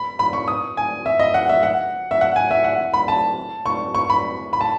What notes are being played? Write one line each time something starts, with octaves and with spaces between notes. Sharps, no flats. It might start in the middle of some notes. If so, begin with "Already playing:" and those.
Already playing: B5
B5
C#6
D#6
G#5
E5
D#5
F#5
E5
F#5
E5
F#5
G#5
E5
F#5
B5
A5
C#6
C#6
B5
B5
A5